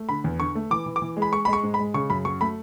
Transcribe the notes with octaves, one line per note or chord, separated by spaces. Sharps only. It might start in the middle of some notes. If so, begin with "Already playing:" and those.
Already playing: A3
D3 B5
E2
D3 C#6
A3
E3 D6
E3
D6
E3
G#3
B5
G#3 C#6
G#3 B5
C#6
G#2
B5
G#3
C#3 C#6
F#2 B5
F#3 C#6
A3 B5